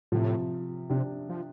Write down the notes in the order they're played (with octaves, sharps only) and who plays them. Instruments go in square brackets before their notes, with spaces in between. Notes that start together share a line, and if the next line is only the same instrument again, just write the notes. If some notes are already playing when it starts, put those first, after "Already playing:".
[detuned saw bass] A2 [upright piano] C3 F3
[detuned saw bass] C3 [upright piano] D4 G4
[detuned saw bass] F3